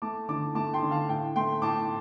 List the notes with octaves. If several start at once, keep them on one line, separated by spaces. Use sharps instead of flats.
A3 A5 D6
D3 A5 D6
A3 A5 D6
G5 C6
D3
F5 A5
A2 G5
A3 G5 C6
A2 A5 D6